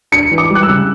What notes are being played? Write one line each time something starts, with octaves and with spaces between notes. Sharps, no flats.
D4 C#7
E3
D6
G3 F#6
E6
C#3